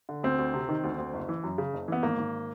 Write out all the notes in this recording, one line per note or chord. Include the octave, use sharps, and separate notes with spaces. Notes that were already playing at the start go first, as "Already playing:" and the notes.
D3
D2 C4
D2
C3
D#3
D2
D2
F#1
E3
F#2
C#3
F#1
E3 B3
G#1 A#3
G#1